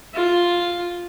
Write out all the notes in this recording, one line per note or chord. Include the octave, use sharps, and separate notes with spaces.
F4